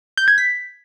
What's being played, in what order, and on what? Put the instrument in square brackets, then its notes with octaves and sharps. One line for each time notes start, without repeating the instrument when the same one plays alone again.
[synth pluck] G6
G#6
B6